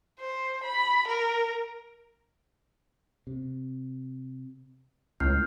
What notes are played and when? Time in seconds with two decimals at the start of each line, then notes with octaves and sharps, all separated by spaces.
0.20 C5
0.64 B5
1.08 A#4
3.27 C3
5.20 C#2 A2 F6 G6 C7